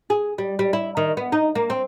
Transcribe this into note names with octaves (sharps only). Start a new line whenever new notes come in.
G#4
G3
G3
E4
D#3
B3
D#4
A#3
C4